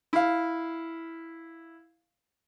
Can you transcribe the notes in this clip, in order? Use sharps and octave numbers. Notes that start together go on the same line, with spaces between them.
E4 F5